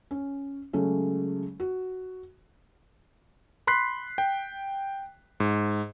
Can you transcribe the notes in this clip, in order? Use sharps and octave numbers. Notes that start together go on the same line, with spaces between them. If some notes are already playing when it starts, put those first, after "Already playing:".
C#4
C#3 F#3 G#3 A3 C#4
F#4
B5 C6 F#6 B6 C7
G5
G#2